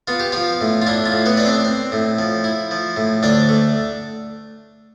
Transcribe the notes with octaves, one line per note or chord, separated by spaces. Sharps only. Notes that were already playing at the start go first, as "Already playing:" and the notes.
B3 F4
G4
F3 F4
A2
F4
D4 E4
F4
A2
B3 B4
D4 D5
C4 C5
C4
A2
F3
E4
F3
A2
D2 D4 D5
A3